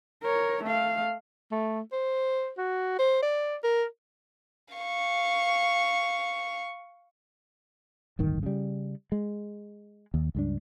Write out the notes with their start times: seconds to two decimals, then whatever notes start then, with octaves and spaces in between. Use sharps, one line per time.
0.22 A#4 C#5
0.63 A3 F5
1.52 A3
1.92 C5
2.58 F#4
2.99 C5
3.22 D5
3.64 A#4
4.75 F5 C#6
8.19 D1 G1 D#3
8.43 C#3 G3
9.12 G#3
10.14 D#2
10.35 C#2 G2 D4